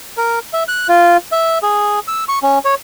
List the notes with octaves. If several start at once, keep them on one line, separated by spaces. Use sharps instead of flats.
A#4
E5
F#6
F4
E5
G#4
E6
C#6
C#4
C#5